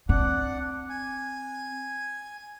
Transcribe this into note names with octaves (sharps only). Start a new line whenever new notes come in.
C4 D4 F#5
G#5